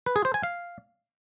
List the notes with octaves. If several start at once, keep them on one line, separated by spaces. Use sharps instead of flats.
B4
G#4
C5
G#5
F5